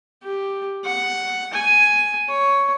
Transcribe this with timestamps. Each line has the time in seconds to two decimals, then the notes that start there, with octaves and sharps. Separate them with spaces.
0.23 G4
0.85 F#5
1.53 G#5
2.29 C#5